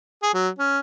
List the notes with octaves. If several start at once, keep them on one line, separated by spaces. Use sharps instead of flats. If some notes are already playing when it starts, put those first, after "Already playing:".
G#4
F#3
C#4